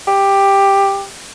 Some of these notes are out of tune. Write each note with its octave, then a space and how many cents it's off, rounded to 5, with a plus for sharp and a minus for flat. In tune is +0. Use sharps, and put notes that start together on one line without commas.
G4 +10